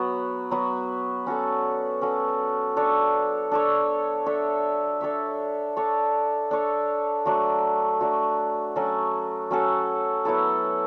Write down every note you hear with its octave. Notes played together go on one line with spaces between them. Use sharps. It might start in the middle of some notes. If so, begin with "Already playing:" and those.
Already playing: F#3 B3 F#4 B4
F#3 B3 F#4 B4
C#4 F#4 A4 D5
C#4 F#4 A4 D5
D4 A4 C#5
D4 A4 C#5
D4 A4 C#5 E5
D4 A4 C#5 E5
D4 A4 C#5
D4 A4 C#5
F#3 A3 D4 F#4
F#3 A3 D4 F#4
F#3 C#4 F#4 A4
F#3 C#4 F#4 A4
F#3 B3 E4 A4